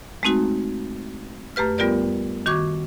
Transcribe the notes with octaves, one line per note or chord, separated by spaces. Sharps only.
G#3 A3 C4 D#4 F#4
F#2 A3 G4 B4 F6
G3 B3 F4 G4 A#4 D5
D#3 F#4 C#6 D6 G#6